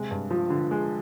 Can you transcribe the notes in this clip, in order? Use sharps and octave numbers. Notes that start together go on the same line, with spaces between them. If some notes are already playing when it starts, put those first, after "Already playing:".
Already playing: C3 G#3
G2
F3
D3
G#3